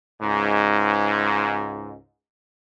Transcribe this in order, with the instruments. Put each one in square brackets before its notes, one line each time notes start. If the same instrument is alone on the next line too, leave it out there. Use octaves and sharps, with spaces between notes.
[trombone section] C#2 G#2